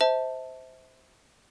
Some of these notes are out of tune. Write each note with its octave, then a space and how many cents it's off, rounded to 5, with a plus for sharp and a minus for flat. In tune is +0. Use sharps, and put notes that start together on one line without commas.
C5 -10 E5 -35 A5 +5